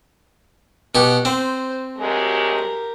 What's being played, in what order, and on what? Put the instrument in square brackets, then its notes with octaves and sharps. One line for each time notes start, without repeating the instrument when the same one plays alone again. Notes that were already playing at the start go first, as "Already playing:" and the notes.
[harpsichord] B2 G4 [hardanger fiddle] F#5
[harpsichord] C4 [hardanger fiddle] C5
[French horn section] D2 F#3 G#3 [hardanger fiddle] G4 A#4